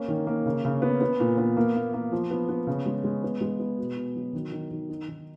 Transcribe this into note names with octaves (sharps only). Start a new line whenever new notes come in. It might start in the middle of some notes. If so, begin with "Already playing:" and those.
Already playing: A#3 C#4
D#3
A#3
C#3
C#3
B3
B3
A#2
B3
A#3
A#3
A#3
F3
B3
B3
C#3
G#3
G#3
B3
G#3
B3
B2
B2
F#3
D#3
D#3
D#3
D#4
D#3